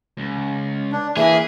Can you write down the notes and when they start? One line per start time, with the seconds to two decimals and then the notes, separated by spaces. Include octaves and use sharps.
0.17 C#2
0.92 D4
1.17 E3 A#3 G#4 E5